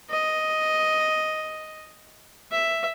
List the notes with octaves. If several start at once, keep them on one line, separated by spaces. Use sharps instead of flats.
D#5
E5